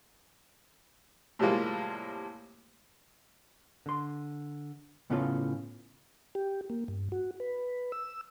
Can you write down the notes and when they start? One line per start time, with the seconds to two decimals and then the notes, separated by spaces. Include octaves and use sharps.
1.39 A2 C3 F3 G3 G#3 A#3
3.86 D3 C6
5.10 A2 C#3 B3 C#4 F4 A4
6.35 G4
6.70 A#3
6.88 G2
7.12 F#4
7.40 B4
7.92 E6